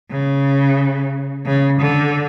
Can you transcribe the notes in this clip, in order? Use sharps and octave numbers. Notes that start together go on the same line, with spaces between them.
C#3
C#3
D3